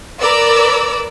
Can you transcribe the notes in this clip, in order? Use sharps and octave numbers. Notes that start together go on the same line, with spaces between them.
A#4 B4 D5 D6 E6